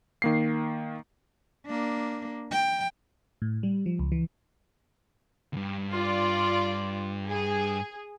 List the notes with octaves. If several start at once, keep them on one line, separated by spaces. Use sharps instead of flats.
D#3 A#3 C7
A#3 D4
G5
A2
G3
F3
C#2
E3
D2 G2
F4 D5
G#4